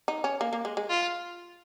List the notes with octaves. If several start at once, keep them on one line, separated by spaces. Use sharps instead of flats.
D#4
C#4
A#3
A#3
G#3
G#3
F4